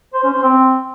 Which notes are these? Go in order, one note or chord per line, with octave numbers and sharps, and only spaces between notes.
C5
C#4
C5
C4